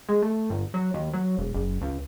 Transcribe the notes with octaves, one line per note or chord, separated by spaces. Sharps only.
G#3
A3
G1
F#3
D#2
F#3
E1
F#1
C#2